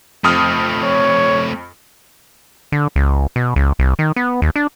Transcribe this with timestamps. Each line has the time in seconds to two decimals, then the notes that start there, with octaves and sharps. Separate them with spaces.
0.24 F2 A3 C4 D#6 F6
0.84 C#5
2.72 D3
2.96 C#2
3.36 B2
3.56 C#2
3.79 C2
3.99 D#3
4.16 B3
4.42 D#2
4.56 D4